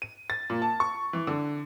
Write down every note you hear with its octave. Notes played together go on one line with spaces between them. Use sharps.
D#7
A6
A#2
A5
C#6
E3
D3